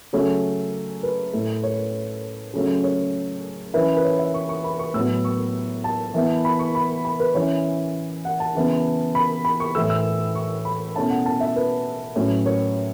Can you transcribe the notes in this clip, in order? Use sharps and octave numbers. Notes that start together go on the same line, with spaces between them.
C#3 F#3 A3 C#4 C#5
B4
A2 A3 E4
C#5
C#3 F#3 A3 C#4
C#5
E3 C#4 E4 B4
B4
C#5
E5
C#6
C#6
B5
C#6
A2 F#3 B3 E6
C#6
A5
E3 B3 E4
B5
C#6
B5
B5
B4
E3 C#4 E4 C#5
F#5
A5
C#3 E3 B3
B5
B5
C#6
A2 E3 A3 E6
E6
C#6
B5
B2 A3 C#4 E4 A5
F#5
A5
E5
B4
A2 F#3 C#4
C#5